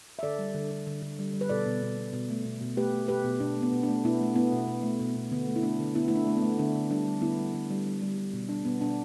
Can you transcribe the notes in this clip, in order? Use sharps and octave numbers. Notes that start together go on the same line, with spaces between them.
E5
D3 A4 D5
G3
D3
D3
D3
D3
G3
G3
B4
B2 A4 D5
B2
B2
B2
B2
A3
B2
B2
A3 G4 B4
A3
B2 G4 B4
B2
B2 D4
A3
B3
B2
D4
A3
B2 B3 E4
A3
A3 B3 E4
B2
B2
A3
B2
B2
D3 B3
A3
E4
A3 D4
D3
D3 B3 E4
A3 E4
D4
A3 D4
B3
A3
D3 D4
D3
G3 D4
G3
D3 B3 E4
G3
D3
G3
G3
G3
G3
B2
G3 D4
B2 B3
B2 D4